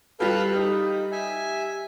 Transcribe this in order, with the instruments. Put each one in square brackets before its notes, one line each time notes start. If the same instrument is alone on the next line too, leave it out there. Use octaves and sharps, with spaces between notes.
[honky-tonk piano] G3 G4 [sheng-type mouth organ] A4 B4 F5
[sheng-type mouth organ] D#4
E5 G#5